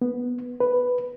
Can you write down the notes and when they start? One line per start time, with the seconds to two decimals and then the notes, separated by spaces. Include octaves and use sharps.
0.02 B3
0.60 B4